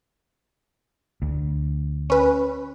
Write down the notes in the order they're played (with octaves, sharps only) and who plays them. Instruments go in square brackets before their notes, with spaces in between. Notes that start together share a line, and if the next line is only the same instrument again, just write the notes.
[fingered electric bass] D2
[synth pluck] C#4 B4